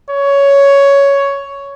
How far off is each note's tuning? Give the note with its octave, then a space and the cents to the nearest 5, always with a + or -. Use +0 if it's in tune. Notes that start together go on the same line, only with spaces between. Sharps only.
C#5 +10